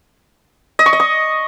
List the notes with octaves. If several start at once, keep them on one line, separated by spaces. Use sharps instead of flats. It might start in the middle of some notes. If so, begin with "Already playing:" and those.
D#5
C#6
D#5
D#6